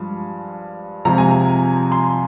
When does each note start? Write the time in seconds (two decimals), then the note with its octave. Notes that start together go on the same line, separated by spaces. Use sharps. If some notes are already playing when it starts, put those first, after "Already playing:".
Already playing: G2 F3 G#3
1.05 F2 C3 F3 G#3 A#5
1.18 G#5
1.31 A#5
1.92 C6